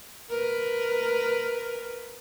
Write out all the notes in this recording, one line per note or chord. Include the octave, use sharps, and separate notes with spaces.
A#4 B4